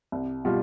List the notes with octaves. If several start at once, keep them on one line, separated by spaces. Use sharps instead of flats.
C2
B2 G3 F4